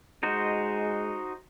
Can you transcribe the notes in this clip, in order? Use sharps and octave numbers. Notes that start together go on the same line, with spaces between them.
G#3 D#4 F#4 C5